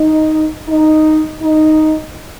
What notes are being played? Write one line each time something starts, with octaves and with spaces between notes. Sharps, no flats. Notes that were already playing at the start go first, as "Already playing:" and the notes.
Already playing: D#4
D#4
D#4